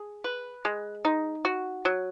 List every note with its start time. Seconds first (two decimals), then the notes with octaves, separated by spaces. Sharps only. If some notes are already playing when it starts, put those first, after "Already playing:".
Already playing: G#4
0.24 B4
0.65 G#3
1.05 D#4
1.45 F#4
1.85 F#3